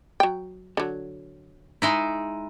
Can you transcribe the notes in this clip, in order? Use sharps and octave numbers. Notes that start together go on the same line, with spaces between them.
F#3 G5
D3 F#3
G#3 D#4 E4